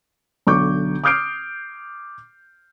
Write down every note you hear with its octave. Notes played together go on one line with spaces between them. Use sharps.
B1 D3 C#6 D6 G6
D6 D#6 F6 G6 C7 D7